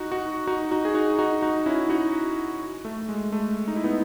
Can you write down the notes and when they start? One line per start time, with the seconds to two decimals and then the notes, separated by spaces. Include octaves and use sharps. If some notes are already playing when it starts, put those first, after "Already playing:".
Already playing: D#4 F#4
0.12 D#4 F#4
0.47 D#4 F#4
0.71 D#4 F#4
0.85 G#4
0.95 D#4 F#4
1.19 D#4 F#4
1.42 D#4 F#4
1.66 C#4 E4
1.90 D#4 F#4
2.85 A3
3.09 G#3
3.32 A3
3.68 D#4
3.76 E4
3.84 B3 D#4